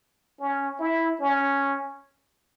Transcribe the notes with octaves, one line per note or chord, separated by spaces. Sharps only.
C#4
E4
C#4